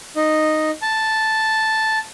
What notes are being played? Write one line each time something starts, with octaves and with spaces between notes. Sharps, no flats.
D#4
A5